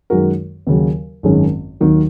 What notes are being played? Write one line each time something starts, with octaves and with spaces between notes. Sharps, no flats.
F#2 D#3 G#3 F#4 A#4
D#2 C#3 F#3
G#1 F#2 D#3 G#3 C#4
D#2 D#3 F#3